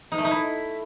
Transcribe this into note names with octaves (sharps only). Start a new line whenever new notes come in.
D#4
A3
D#4
E4